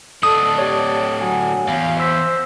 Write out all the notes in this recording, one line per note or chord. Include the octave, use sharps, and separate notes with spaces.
A2 D4 A4 D#6
G4 C#5 D5
F#3 G#5
E2 F5
C5 E6 B6